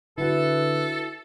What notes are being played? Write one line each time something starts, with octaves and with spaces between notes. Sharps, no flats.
D3 E4 F#4 A4 B4